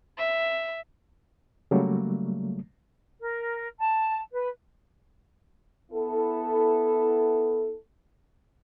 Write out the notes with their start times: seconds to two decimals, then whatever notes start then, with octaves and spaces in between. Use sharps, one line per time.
0.18 E5
1.71 C#3 F#3 G3 A3 A#3
3.20 A#4
3.80 A5
4.32 B4
5.91 B3 E4 A4